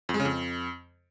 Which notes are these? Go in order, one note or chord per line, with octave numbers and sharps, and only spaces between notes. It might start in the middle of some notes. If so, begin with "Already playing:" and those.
F2
G#3
C#3
F2